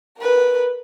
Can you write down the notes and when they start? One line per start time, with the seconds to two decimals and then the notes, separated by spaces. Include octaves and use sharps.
0.19 A#4 B4